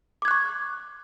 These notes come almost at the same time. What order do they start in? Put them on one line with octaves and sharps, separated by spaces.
D6 G#6 F#6 C#6